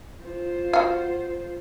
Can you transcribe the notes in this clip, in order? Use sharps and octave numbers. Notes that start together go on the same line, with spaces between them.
F4 C5
F#4 F5